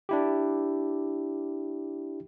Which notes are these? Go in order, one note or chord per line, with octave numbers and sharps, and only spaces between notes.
D4 E4 G4